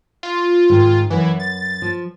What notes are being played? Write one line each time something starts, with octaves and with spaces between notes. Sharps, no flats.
F4
G#2 D#3 G#3
F#2 E3 B4 F#5
A6
F3